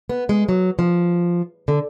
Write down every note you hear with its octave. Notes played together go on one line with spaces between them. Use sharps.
B3
G#3
F#3
F3
D3